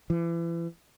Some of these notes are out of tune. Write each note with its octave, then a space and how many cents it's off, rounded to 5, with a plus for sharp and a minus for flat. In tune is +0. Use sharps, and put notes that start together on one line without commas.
E3 +35